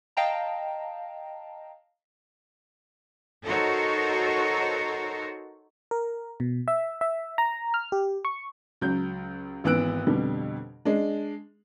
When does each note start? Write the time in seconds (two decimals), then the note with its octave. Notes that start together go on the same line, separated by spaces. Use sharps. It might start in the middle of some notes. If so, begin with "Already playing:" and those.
0.17 D#5 F5 G5 A5 A#5
3.46 D#4 F#4 A4 A#4 C5 C#5
5.91 A#4
6.40 B2
6.68 E5
7.01 E5
7.38 A#5
7.74 F6
7.92 G4
8.25 C#6
8.81 C#2 F#3 G6
9.64 G#1 E3 B3 E6 F#6 D7
10.07 F2 B2 D3 G3
10.85 G#3 D4